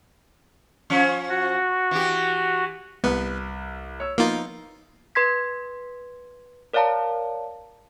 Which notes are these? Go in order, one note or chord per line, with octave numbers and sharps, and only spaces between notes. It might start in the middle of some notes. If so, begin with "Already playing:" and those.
F3 C#4
F#4
E3 G4
C2 B3 B4
C#5 E6
F3 A#3 B3 D#4 F4
B4 C6 G#6 B6
A#4 C#5 D5 F5 A5 A#5